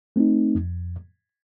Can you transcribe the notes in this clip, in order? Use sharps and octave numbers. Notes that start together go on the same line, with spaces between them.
A3 C4 D#4
F2